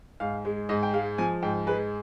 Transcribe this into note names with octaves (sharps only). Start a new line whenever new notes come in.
G#2 F5
G#3
G#2 D#5
G5
G#3 F5
F3 G#5
G#2 G5
G#3 B4